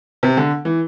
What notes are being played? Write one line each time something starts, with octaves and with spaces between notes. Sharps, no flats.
C3
D3
E3